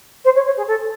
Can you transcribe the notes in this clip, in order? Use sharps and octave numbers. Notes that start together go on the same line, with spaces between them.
C5
C#5
C#5
G#4
A4